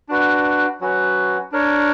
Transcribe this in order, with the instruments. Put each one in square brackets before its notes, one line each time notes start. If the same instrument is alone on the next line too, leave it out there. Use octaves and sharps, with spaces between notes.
[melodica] D4 F#4 B4
F#3 C#4 F#4 B4
D4 A#4 C#5